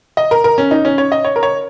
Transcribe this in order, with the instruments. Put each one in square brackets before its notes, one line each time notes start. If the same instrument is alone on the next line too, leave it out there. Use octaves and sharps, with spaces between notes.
[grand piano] D#5
A#4
A#4
C#4
D#4
C#4
C#5
D#5
C#5
A#4
C#5